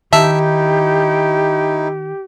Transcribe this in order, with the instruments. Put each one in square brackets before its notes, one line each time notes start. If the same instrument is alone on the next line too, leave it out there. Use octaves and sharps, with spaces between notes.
[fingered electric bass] D#3 [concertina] D#4 E4 [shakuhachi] G4 [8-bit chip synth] E5 A5 E6